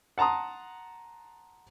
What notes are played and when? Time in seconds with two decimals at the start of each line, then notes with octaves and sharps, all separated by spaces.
0.18 F#5 A5 A#5 C6 D#6